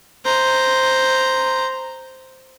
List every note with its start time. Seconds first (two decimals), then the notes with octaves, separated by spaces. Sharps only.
0.25 C5 A#5